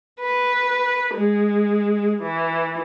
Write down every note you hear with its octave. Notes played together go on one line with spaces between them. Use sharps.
B4
G#3
E3